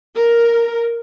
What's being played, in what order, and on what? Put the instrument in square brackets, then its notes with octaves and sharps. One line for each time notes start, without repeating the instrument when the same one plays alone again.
[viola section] A#4